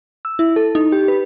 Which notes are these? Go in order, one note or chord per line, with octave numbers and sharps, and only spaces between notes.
E6
E4
A4
D#4
G4
B4